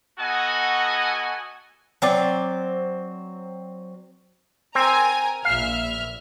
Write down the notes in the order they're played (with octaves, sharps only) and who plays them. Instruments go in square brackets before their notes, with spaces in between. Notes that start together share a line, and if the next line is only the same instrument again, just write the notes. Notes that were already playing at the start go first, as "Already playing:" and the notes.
[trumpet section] B3 F#4 A4 D#5 F#5 G#5
[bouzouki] F#3 C4 D5
[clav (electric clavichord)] C4 [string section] A#4 G#5 A#5
[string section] A#1 E5 F6 [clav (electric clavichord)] F5